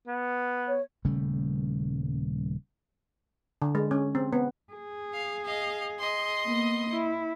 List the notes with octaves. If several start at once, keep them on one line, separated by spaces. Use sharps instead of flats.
B3
C#5
D#1 C#3 G3 A3
D3
G#3
C#4
C4
B3
G#4
F5
D#5 F5
D#5 C6
A#3 B3
E4